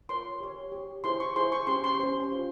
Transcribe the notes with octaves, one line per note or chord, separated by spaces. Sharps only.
F4 A#4 C#5 C6
G4 C#5
G4 C#5
E4 G#4 C5 C6
C#6
E4 G#4 C5 C6
C#6
C#4 G4 C5 C6
C6
C#4 G4 C5
F4 C5